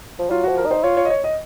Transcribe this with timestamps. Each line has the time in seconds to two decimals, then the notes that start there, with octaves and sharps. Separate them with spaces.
0.19 F3
0.30 F#3 F4
0.43 F#4
0.48 F3
0.57 A#4
0.66 D#4 C5
0.84 F4 C#5
0.97 C#5
1.05 D#5
1.10 C#5
1.24 D#5